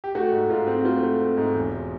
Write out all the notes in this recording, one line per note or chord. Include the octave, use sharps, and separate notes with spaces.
G4
A3 F#4
G#2
G#2 F4
C4
F#4
A3 F4
A3
C4
G#2
E1